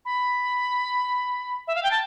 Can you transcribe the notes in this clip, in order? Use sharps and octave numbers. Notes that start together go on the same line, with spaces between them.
B5
E5
F5
G5
A5